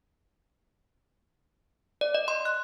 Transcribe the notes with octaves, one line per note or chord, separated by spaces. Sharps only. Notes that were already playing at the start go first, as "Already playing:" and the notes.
D5
D#5
C6
F#6